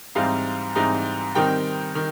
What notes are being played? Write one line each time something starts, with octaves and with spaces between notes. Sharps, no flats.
G#2 E3 G3 C4 D#4 F5
G#2 E3 G3 C4 D#4
D#3 G3 C4 D#4 G5
D#3